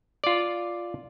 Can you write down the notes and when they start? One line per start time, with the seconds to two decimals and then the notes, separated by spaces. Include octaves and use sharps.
0.24 F4 D5